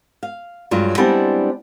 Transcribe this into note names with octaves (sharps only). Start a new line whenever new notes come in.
F5
G2 F#3 G#3 F4
G3 G#3 B3 C4 D4 E4